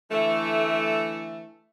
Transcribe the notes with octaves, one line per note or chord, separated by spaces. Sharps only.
D3 E3 A3